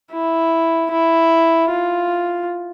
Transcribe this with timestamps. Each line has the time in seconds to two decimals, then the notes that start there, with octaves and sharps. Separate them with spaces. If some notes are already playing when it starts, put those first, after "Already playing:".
0.13 E4
0.91 E4
1.70 F4